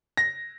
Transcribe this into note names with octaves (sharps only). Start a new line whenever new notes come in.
A#6